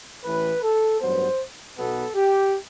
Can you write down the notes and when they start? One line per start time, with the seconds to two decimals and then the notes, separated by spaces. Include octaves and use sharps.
0.24 A1 A2 E3 B4
0.63 A4
1.00 A1 G2 F#3 B3 C5
1.77 B1 B2 F#3 B3 A4
2.15 G4